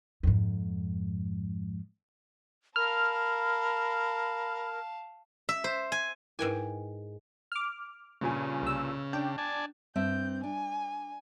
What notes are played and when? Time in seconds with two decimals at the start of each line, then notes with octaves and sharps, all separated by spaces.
0.23 F2 G#2
2.76 A#4 F5 A5 B5 F6
5.49 E5
5.64 C5
5.92 G#5
6.39 G#2 E4 A#4 B4 G5 G#5
7.52 D6 F6
8.21 G2 A#2 C#3 G#5
8.62 C2 E6
9.13 D4 G5
9.38 D5 G#5 A5
9.96 G2 C4 E5 G6
10.43 D4 G#5